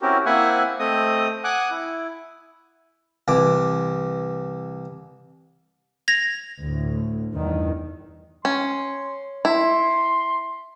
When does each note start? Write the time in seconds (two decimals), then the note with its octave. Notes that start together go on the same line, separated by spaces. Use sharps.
0.02 C4 C#4 E4 F#4 G4 A#4
0.26 A#3 C4 E4 E5 F#5 G#5
0.79 A3 C4 D#5 D#6
1.44 F#5 G#5 D6 D#6 F#6
1.71 E4
3.28 C2 E3 D6
6.08 G#6 A#6 F7
6.61 D2 A2
7.34 E2 G2 D#3
8.45 C#4 C6
9.45 E4 C6